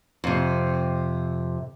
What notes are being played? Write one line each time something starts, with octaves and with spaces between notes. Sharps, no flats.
F2 C3